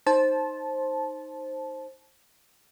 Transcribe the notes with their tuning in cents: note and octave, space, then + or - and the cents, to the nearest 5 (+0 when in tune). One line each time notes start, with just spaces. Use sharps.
D#4 +0 C5 +15 A5 -15